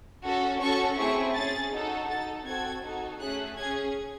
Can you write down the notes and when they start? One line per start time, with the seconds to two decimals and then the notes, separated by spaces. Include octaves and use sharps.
0.25 C#4 F#4 A4
0.60 C#4 F#4 A4 C#6
0.98 A3 C4 E4 G#4 C#6
1.34 C#4 G#4 A6
1.72 D#4 F#4 A4
2.08 D#4 A4 A6
2.46 C4 F#4 A4 G#6
2.84 D#4 F#4 A4
3.20 A3 C#4 G#4 F#6
3.57 C#4 G#4 G#6